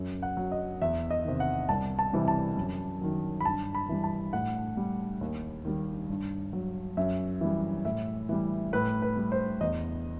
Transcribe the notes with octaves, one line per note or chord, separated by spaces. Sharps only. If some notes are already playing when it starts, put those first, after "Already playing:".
Already playing: F#2
F#5
F#3
D#5
E2 E5
D#5
C3 D#3
F#5
C2 A5
A5
C3 E3 G3
A5
F#2
D#3 F#3
B5
G2 A5
B5
E3 G3
A5
A2 F#5
G3
D#2
D#3 G3
G2
F#3
F#2 E5
E3 G3
A2 E5
E3 G3
A2 B4
B4
G3
C5
E2 D#5